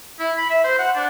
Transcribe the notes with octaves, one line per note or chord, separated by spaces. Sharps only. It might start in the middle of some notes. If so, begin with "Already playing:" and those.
E4
B5
E5
C5
F#5
D4